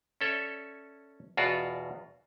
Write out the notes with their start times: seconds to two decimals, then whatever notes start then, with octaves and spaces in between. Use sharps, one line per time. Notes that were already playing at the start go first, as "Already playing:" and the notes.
0.21 C#4 A4 C#5 D5 E5
1.37 E2 B2 F4 F#4 D5